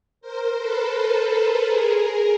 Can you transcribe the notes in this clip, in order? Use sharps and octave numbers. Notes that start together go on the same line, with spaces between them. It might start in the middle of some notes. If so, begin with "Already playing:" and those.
A#4 C5
A4 B4
A4 B4
G#4 A#4